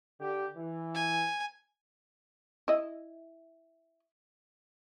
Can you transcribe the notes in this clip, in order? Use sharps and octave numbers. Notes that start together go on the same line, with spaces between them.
D3 G4
E3
G#5
E4 D#5